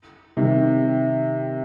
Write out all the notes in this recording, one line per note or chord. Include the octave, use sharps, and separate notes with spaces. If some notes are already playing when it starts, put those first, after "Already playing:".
C3 D#3